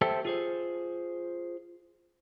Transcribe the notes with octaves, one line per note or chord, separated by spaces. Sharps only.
G4 A4 C5 E5 G5 A5
F4 G#4 C5